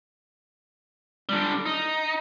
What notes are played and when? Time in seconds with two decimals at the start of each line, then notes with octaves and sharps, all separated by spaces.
1.29 D3 G3
1.66 D#4